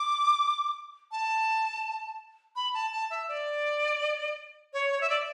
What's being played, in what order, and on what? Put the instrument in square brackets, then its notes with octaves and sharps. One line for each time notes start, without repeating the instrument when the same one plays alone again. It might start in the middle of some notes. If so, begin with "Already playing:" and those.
Already playing: [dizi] D6
A5
B5
A5
A5
E5
D5
C#5
C#5
E5
D5